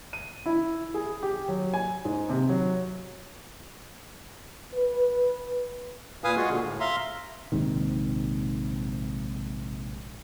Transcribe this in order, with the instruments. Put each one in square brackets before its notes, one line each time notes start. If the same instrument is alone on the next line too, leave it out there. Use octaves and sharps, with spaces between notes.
[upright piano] D#7
E4
G#4
G4
F#3
G#5
G#2
C3
F#3
[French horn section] B4
[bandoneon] A#2 B4 F5 G#5 D#6
G#3 F4 F#4 G#4
A#2 D3
A2
E5 F5 A#5 C6
[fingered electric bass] A#1 G#2 C3 D#3